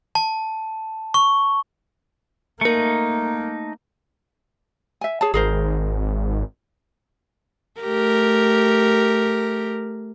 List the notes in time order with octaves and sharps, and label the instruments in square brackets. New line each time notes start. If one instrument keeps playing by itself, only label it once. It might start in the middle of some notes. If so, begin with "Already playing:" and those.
[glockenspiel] A5
C#6
[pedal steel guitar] A3 D#4 [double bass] A#3 [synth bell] A#4 C#7
[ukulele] E5 G#5
G#4 C#5 A5
[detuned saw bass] G#1 [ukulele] G#4 A#4 C5
[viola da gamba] A3 G4 A#4